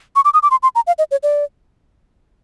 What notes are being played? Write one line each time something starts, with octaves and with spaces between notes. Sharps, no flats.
C#6
D6
D#6
D6
C6
C6
A#5
F5
D#5
C#5
D5